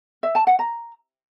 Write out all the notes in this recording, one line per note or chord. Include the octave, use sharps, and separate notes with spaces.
E5
A5
F#5
A#5